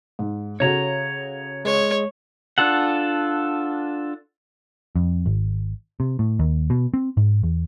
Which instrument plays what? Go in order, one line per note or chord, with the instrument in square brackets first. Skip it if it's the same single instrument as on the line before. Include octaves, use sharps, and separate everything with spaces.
[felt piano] G#2
[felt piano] C#3 F#4 A4 [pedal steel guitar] C#5 A#5
[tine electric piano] G#3 [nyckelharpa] C#5
[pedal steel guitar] D4 F4 A4 F#5
[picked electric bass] F2
G#1
C3
A2
D#2
B2
C4
G#2
E2